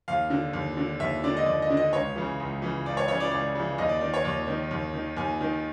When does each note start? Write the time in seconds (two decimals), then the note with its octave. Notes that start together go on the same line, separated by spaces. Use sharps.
0.08 D#2 F5
0.30 D3
0.53 D#2
0.77 D3
1.00 D#2 E5
1.24 D3 D5
1.37 D#5
1.46 D#2 D5
1.62 D#5
1.70 D3
1.77 D#5
1.93 C#2 C#5
2.16 C#3 E3
2.40 C#2
2.62 C#3 E3
2.86 C#2 D5
2.97 C#5
3.08 C#3 E3 C#5
3.20 D5
3.31 C#2 D5
3.55 C#3 E3
3.78 D#2 D#5
3.89 D5
4.01 D#3 D5
4.14 C#5
4.24 D#2 D5
4.47 D#3
4.71 D#2
4.94 D#3
5.17 D#2 G#5
5.41 D#3